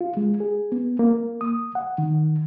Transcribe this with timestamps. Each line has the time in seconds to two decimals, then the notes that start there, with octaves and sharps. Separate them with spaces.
0.01 F4
0.17 G#3
0.40 G#4
0.72 B3
0.99 A#3
1.41 D#6
1.75 F#5
1.98 D#3